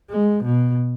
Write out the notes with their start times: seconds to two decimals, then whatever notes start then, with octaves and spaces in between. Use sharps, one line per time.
0.10 G#3
0.45 B2